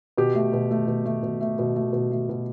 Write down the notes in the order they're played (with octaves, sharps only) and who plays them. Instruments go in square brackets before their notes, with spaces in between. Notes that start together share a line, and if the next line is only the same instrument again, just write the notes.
[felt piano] B2 G4
A3
B2
A3
B2
A3
B2
A3
B2
A3
B2
A3
B2